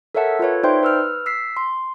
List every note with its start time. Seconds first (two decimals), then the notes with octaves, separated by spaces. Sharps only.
0.15 A4 A#4 C#5 E5 F#5 A5
0.39 F4 A4 B4 C#5
0.63 D#4 C5 D5 E5 G5 C6
0.83 B4 E6 F6
1.26 E6 B6 C7
1.57 C6